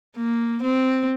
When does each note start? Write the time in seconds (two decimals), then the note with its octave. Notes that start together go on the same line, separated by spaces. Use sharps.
0.17 A#3
0.63 C4